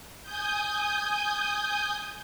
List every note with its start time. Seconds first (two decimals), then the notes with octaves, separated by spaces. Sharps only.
0.23 G#5 D#6 G6